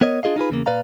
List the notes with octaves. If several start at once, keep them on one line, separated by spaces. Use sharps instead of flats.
B3 A#4 C#5 D#5
D4 F4 G#4 D#5 F5
D#4 F4 G#4 B4
E2 C#3 A#3
A#2 B4 D5 F5 A#5